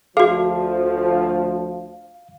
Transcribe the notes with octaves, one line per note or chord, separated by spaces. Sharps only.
D2 F3 F#4 G#4 F5